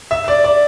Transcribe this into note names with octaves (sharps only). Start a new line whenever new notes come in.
E5
D5
D5